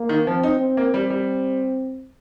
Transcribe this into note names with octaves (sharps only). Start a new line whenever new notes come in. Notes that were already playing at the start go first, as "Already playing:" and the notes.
Already playing: A#3
D#3
F3 C4
D#4
C4
A#3
G3 C4
G3